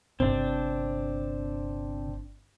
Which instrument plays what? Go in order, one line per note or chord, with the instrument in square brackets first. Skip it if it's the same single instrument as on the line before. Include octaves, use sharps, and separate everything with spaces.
[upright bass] G1 [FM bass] C3 [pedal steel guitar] C4 D4